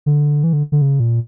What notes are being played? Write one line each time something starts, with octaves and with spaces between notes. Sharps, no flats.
D3
E3
D3
D3
C#3
A#2